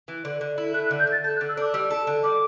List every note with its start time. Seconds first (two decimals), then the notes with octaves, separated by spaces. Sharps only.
0.08 E3
0.25 D3
0.41 D3
0.58 E4
0.74 A3 F#6
0.86 F#6
0.91 D3
1.00 G6
1.07 D3 A6
1.24 A4 G6
1.36 F#6
1.41 D3
1.49 E6
1.57 D4 D6
1.74 G3 E6
1.91 A4
2.07 D3
2.24 G3 D6